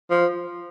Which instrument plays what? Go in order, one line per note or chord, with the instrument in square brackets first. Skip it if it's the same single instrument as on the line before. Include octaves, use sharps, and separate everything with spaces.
[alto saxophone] F3